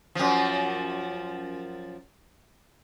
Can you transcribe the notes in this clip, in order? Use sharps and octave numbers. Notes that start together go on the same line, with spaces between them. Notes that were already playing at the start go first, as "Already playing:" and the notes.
F#2 F3